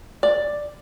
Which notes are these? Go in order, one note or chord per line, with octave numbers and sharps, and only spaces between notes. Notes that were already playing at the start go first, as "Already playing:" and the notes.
D5